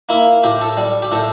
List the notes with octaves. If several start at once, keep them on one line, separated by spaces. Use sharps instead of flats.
A#3 E4
A2 G4
A4
G3
G4
A2 A4